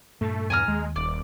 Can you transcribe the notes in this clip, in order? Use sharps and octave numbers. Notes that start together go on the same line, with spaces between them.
G2 A#2 A3
E2 G#5 A#5 F6
D#2 G#3
D#1 D5